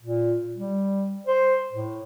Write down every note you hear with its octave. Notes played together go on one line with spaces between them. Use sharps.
A#2
G3
C5
A2